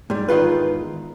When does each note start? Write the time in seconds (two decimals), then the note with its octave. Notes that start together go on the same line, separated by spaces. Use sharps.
0.10 G#2 G3
0.28 E2 G#2 D#3 F4 B4